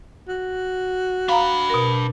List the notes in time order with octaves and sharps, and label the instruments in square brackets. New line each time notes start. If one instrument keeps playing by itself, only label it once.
[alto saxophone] F#4
[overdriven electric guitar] D4 B5 [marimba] F5 A#5
[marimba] B2 A#4